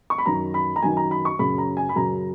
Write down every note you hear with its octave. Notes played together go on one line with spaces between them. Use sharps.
C#6
B5
F#2 D#3 A#5
B5
A#5
F#2 D#3 G#5
A#5
B5
C#6
F#2 C#3 B5
A#5
G#5
B5
F#2 C#3 A#5